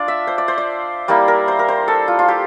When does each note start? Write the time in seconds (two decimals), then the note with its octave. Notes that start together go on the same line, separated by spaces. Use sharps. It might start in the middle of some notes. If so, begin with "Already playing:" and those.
Already playing: D4 F4 D5
0.08 E5
0.27 C5
0.38 D5
0.48 C5
0.58 D5
1.08 G3 A#3 E4 D5
1.28 A#4
1.48 C5
1.59 A#4
1.68 C5
1.88 A4
2.08 F4
2.19 F4
2.28 G4